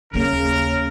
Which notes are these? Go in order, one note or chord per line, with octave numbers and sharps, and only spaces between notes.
D#2 C#3 A#3 A#4